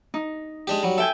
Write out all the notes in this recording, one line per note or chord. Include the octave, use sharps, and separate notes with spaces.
D#4
G#3 D4 G4
F#3 G3
A4 E5 G5 G#5